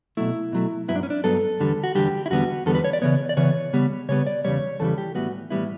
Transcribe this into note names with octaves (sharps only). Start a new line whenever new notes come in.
B2 F#3 A3 E4
B2 F#3 A3
G2 F#3 B3 E4
D4
C#4
D4
G2 F#3 B3 A4
E2 D3 G3
F#4
E2 D3 G3 G4
E4
E2 D3 G3 B3 F#4
E2 D3 G3 B3 A4
B4
C#5
D5
C#3 E3 B3 C#5
D5
C#3 E3 B3 C#5
C#3 G3 B3
C#3 G3 B3 C#5
D5
E2 C#3 E3 G3 C#5
E2 C#3 E3 G3 A4
G4
A2 E3 G3 B3 F#4
A2 E3 G3 B3 E4